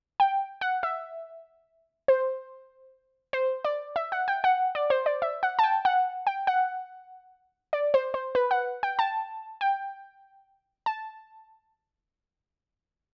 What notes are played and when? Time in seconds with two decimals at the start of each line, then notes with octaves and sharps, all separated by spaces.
0.20 G5
0.61 F#5
0.83 E5
2.08 C5
3.33 C5
3.64 D5
3.96 E5
4.12 F#5
4.28 G5
4.44 F#5
4.75 D5
4.90 C5
5.06 D5
5.22 E5
5.43 F#5
5.59 A5
5.63 G5
5.85 F#5
6.27 G5
6.47 F#5
7.73 D5
7.94 C5
8.14 C5
8.35 B4
8.51 F#5
8.83 G5
8.99 A5
9.61 G5
10.86 A5